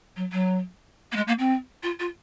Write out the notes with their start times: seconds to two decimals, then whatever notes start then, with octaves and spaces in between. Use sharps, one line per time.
0.16 F#3
0.32 F#3
1.12 A#3
1.16 G#3
1.27 A#3
1.39 C4
1.83 F4
1.99 F4